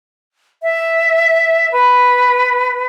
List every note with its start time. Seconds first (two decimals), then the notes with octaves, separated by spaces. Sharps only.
0.63 E5
1.72 B4